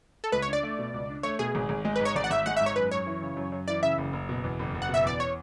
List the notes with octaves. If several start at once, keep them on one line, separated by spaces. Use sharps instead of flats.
A4
C#2 B4
C#5
D4 D5
A3
B2
C#2
D4
A3 C#5
B2 G#4
G#1
G#1
G#3
B4
G#2
C#5
G#1 D5
F#5
G#1 E5
G#3 F#5
E5
G#2
C#5
F#2 B4
F#2 C#5
E3
C#3
F#2
F#2
E3 D5
C#3 E5
F#1
F#1
B2
E2
F#1
F#1
F#5
B2 E5
E2 D5
C#5